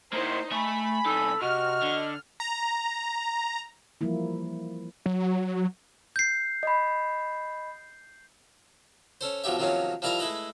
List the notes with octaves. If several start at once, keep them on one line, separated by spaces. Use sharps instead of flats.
A#3 D#4 E4 C5
A3 E5 G#5 B5
C2 D#4 A4
C3 F#4 D#5 F6
D3
A#5
E3 F3 G3 A#3 E4
F#3
G6 C7
D#5 B5
C#4 A4 C5
B1 F3 F#3 G4 E5
C3 D#3 F3 F#3 A#3 C#4
F3 G3 E4 A#4 A5 A#5
G#3 A3 E4 B4 D#5